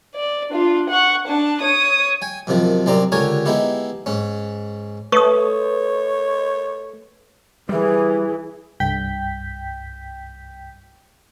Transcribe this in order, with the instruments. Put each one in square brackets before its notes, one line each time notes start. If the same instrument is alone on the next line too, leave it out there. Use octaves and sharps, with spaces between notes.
[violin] D5
D4 F4
F#5 C#6
D4 A5
C#5 D#6
[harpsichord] G5 G#5
F#2 C3 D#3 F3
C2 F#2 C4 G4 D5 A#5
C#2 D3 G4 A#4 C#5 G#5
G#3 B3 D#4 E4 G4
G#2 C#4
[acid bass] A3 [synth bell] B4 [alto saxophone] C#5 [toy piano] C#6 D#6
[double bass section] E3 [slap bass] G3 [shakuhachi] G#4
[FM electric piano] C2 G2 G5 G6 B6